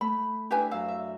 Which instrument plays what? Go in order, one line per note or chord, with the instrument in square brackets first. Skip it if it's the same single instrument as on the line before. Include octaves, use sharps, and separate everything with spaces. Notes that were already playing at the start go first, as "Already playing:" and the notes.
[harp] A3 [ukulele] B5
[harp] D4 E4 [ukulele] G4 B4 G#5
[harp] F#2 E4 E6 [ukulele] F5
[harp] E5